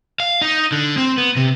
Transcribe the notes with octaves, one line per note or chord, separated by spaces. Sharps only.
F5
D#4
D3
C4
B3
C3